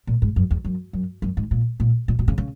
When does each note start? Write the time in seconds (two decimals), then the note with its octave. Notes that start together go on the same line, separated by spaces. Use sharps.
0.07 A#2
0.22 G#2
0.36 F#2
0.51 E2
0.65 F#2
0.93 F#2
1.22 F#2
1.37 G#2
1.51 A#2
1.80 A#2
2.08 A#2
2.19 B2
2.28 C#3
2.38 C#3